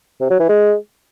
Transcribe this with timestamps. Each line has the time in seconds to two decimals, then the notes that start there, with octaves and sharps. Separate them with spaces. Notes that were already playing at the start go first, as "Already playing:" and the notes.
0.21 C3
0.30 F#3
0.40 E3
0.49 G#3